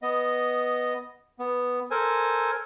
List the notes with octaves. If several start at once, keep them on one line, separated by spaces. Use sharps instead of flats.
B3 D#5
B3
A4 A#4 C5 G#5